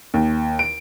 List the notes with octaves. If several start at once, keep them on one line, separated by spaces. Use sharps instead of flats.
D#2
D7